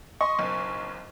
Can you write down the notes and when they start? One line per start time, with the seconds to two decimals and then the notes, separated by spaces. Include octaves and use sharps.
0.21 D#5 C6 C#6
0.39 F#1 B1